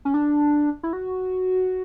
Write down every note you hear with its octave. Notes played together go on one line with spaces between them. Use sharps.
C#4
D4
E4
F#4